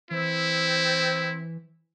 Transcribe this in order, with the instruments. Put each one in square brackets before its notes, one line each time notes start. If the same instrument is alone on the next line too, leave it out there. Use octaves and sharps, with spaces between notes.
[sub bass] E3 [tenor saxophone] C4 [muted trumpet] E4